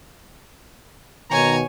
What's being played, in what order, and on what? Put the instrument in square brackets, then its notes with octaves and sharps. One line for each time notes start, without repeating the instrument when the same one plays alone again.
[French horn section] B2 D#3 [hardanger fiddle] C#5 G#5 [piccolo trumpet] A#5